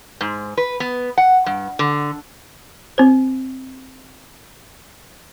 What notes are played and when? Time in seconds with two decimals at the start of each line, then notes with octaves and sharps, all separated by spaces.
0.21 G#2
0.57 B4
0.80 B3
1.17 F#5
1.46 G2
1.79 D3
2.98 C4 C5